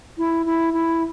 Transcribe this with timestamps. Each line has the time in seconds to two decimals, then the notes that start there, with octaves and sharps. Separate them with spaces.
0.18 E4
0.46 E4
0.74 E4